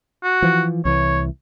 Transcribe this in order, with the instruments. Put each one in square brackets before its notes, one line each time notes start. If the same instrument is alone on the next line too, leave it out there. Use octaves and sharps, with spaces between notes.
[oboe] F#4
[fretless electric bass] E3 F3
[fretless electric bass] C2 E3 [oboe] C#5